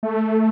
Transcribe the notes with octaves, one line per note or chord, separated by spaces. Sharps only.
A3